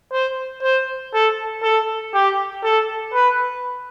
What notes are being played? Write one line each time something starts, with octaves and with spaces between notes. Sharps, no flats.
C5
C5
A4
A4
G4
A4
B4